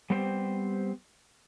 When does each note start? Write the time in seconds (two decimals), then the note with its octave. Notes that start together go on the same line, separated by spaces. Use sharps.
0.10 G3 B3 C4 G4 C5